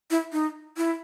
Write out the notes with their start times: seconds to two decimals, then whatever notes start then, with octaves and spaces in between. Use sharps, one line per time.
0.11 E4
0.33 D#4
0.77 E4